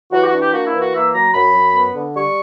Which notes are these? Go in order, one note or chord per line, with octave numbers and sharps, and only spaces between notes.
E3 F#4
G4
F#4
D4
G4
A#3 F#4
E4
E3
F#4
A#3 E5
F#3 A#5
F#2 B5
F#2
B3
D3
G3 C#6